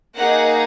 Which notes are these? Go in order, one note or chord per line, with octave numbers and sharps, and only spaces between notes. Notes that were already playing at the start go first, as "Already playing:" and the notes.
A#3 D#4 G#4 F#5